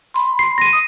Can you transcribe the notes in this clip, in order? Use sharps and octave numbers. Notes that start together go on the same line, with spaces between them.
B5 C6
C7
A#6 D#7
D#6